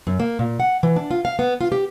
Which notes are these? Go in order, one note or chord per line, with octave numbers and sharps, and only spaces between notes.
F#2
A#3
A#2
F#5
E3
D4
F4
F5
B3
F4
G4